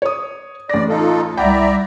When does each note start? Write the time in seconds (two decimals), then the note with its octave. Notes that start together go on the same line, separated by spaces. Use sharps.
0.02 C#5 D#6
0.69 A1 D5 A#6
0.89 D#4 F4 A4
1.37 C2 D5 E5 F#5 G5 A#5 B5